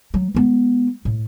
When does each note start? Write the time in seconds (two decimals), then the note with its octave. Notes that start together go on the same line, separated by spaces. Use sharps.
0.14 F#3
0.35 G#3 B3
1.05 A2